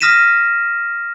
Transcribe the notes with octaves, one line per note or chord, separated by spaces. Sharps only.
D#6 F6 A#6 B6 D#7 E7